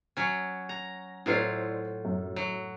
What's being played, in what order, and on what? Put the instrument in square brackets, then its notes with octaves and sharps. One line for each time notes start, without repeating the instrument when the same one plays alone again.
[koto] F#3 C#4
A#5
[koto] A2 F#3 F4 [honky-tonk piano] E4 C5 D5
[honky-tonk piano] F#2
[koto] F#3